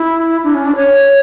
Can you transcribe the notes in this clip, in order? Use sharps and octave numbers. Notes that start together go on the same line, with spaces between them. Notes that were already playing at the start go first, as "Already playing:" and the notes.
Already playing: E4
D4
C#4
D4
C#5